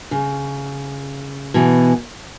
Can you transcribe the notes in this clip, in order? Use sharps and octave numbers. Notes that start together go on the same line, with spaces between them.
C#3
B2 E3